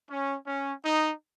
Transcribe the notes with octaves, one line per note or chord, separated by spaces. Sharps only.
C#4
C#4
D#4